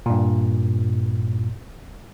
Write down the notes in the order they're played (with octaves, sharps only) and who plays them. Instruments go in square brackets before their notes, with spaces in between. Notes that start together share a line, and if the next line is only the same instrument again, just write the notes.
[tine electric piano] G2 A#2